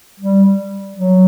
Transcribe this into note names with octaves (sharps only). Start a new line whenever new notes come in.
G3
F#3